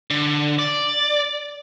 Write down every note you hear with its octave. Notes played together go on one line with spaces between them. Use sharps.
D3
D5